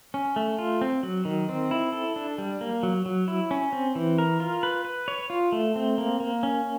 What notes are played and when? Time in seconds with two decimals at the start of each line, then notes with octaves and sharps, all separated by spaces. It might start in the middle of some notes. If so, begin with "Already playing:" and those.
0.14 C#4
0.36 A3
0.59 F4
0.81 C4
1.03 F#3
1.25 D#3
1.49 C4
1.71 E4
1.93 A4
2.16 D4
2.38 G3
2.61 A#3
2.83 F#3
3.06 F#3
3.28 E4
3.51 C#4
3.73 C4
3.95 E3
4.18 A#4
4.40 F4
4.63 B4
4.85 B4
5.08 C#5
5.30 F4
5.52 A3
5.76 C4
5.98 A#3
6.20 A#3
6.43 C#4